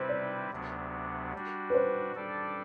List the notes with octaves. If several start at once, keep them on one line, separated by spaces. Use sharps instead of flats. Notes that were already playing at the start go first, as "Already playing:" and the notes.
Already playing: C3 G3 C4 E4 B4 C5
D5
D2 C3 F#3 B3 D4
G3 D4 F#4
B4
C5
G3 D4 A4 D5